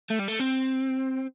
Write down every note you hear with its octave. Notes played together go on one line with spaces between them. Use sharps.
A3
G3
A3
C4